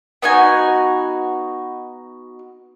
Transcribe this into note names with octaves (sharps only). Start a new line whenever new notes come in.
B3 D#4 F#4 G#5